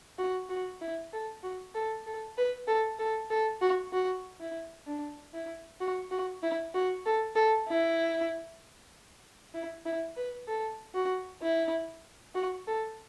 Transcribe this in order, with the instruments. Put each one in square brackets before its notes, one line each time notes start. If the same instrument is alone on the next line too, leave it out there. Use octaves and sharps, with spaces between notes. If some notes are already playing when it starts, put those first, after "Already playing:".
[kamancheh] F#4
F#4
E4
A4
F#4
A4
A4
B4
A4
A4
A4
F#4
F#4
E4
D4
E4
F#4
F#4
E4
F#4
A4
A4
E4
E4
E4
B4
A4
F#4
E4
F#4
A4